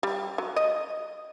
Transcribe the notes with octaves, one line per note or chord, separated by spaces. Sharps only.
G3
F#3
D#5